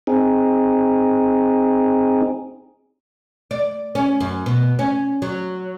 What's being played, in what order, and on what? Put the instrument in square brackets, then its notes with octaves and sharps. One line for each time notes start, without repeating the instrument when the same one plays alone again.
[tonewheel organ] C4 D#4 G#4
[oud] D5
C#4
F#2
B2
C#4
F#3